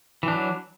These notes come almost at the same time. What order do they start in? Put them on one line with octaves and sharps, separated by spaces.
E3 D4 F#3